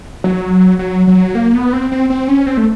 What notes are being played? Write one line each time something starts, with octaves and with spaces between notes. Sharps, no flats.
F#3
F#3
F#3
A#3
B3
C4
C4
C4
C#4
C4
A3